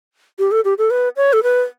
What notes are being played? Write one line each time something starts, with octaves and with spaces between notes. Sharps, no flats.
G4
A4
G4
A4
B4
C#5
A4
B4